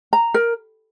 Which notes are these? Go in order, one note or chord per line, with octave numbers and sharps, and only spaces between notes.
A#5
A#4